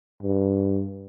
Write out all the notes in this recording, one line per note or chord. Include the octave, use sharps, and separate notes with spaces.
G2